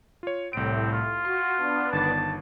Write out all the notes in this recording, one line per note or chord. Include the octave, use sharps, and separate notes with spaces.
F4 C#5
C2 A2 C4 D7
F4
F#4 C6
B3 D4
G1 D#3 A5 A6